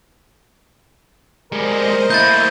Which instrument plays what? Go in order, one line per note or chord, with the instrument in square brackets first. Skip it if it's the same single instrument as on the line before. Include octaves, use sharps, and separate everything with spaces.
[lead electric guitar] G3 G#3 [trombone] A#4 [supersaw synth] C5 D#5
[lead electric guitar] A3 A#3 [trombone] E4 [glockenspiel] G6 A6